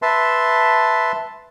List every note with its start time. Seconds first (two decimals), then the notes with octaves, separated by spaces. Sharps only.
0.02 B4 E5 A5 C6